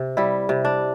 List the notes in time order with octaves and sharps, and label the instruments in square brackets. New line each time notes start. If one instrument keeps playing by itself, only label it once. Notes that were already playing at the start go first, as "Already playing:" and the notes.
Already playing: [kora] C3
G3 E4
C3
D4